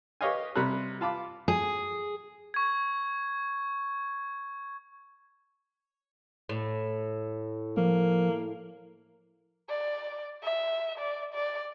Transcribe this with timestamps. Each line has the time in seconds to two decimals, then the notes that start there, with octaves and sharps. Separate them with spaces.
0.21 G4 B4 C#5 D#5 F5 G#5
0.56 C3 G3 A#5 B5 F#6
1.01 F4 F5 A5 B5 D6
1.48 G#4
2.54 C#6 G#6
6.49 A2
7.77 F3 A#3
9.70 D5
10.43 E5
10.98 D5
11.34 D5